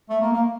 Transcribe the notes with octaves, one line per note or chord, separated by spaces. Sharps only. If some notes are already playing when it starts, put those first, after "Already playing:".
A3
A#3
A#3